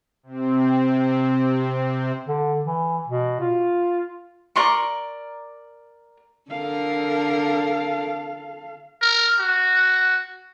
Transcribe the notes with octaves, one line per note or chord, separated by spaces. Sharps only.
C3 C4
D3
E3
B2
F4
A#4 D5 C6 C#6
D3 A4 A#4 F5
A#4
F#4